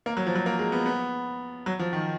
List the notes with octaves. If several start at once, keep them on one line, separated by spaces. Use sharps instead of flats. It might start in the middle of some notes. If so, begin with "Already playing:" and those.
A#3
F#3
F3
F#3
A#3
G#3
B3
B3
F#3
F3
D#3